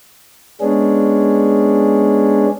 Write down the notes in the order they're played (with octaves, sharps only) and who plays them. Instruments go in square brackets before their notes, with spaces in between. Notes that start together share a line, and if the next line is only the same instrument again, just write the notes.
[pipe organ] G#3 B3 C#4 D4 G#4